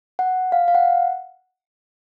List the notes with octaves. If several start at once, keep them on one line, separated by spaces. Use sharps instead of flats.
F#5
F5
F5
F#5